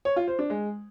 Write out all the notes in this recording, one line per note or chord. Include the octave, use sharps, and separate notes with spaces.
C#5
F4
C5
D4
G#3